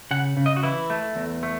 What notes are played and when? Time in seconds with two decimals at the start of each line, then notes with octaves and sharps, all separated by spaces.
0.11 C#3 F#5
0.37 C#3
0.46 D#5
0.57 F#4
0.63 E3 E4
0.90 A3
1.16 E2
1.43 A3